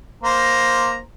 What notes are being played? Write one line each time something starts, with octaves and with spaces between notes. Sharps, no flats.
A#3 C5 A#5